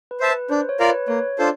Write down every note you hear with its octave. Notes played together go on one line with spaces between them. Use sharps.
B4
C5 E5 A5
B4
D4 C5
C#5
F4 A#4 D5 F5
B4
A#3 C#5
D4 F4 A4 C5